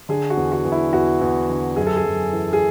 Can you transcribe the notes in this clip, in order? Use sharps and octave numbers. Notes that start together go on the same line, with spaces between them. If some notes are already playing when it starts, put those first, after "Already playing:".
D3 G#4
F#4
E2
F#4
E2
E4
E2 F#4
E2
D3
F#2 G#4
A4
G#4
F#2
E3
G#4